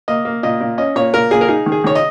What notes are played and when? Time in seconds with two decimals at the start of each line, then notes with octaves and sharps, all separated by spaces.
0.08 A#3 D#5
0.25 A#3
0.43 A#2 D#5
0.61 A#2
0.78 C#4 D#5
0.96 A#2 C#5
1.14 A#2 A#4
1.31 A#2 G#4
1.41 A#4
1.48 D#4 G#4
1.66 D#3
1.72 G#4
1.84 D#3 C#5
1.95 D#5